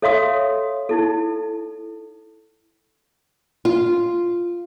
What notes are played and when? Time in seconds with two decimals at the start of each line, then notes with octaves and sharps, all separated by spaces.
0.02 A4 C#5 E5 F5 C6 D#6
0.89 D#4 E4 A4
3.65 F4